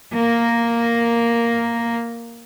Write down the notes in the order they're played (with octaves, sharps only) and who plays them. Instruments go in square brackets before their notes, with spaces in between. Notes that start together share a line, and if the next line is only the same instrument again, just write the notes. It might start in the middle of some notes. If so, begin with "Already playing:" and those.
[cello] A#3 A#4